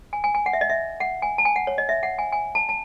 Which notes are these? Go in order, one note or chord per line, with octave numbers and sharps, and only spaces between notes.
G#5
G#5
G#5
F#5
E5
D#5
E5
F#5
G#5
A5
G#5
F#5
C#5
D#5
E5
F#5
G#5
G#5
A5
A5